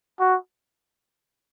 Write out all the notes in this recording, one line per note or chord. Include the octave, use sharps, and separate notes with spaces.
F#4